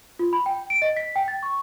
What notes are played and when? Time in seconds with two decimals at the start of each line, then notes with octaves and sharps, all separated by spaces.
0.19 F4
0.33 B5
0.46 G5
0.70 D7
0.82 D#5
0.97 B6
1.16 G5
1.28 A6
1.43 C#6